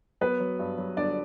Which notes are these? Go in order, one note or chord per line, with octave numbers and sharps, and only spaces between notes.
F#3 B3 B4
F#3
G2
F#3
G1 D4 D5